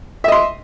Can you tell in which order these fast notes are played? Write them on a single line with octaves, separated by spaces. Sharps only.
E5 D#5 C6